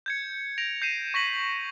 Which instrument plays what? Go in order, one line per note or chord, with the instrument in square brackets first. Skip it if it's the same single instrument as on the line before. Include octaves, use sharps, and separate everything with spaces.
[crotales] G6 G#6 C#7
A#6 D7 F7
G6 C7 D#7 E7
C#6 A#6 B6 F#7
B6